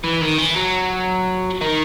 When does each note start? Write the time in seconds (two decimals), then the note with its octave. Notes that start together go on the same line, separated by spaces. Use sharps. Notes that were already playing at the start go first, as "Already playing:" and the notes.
0.04 E3
0.21 D#3
0.38 E3
0.56 F#3
1.61 D#3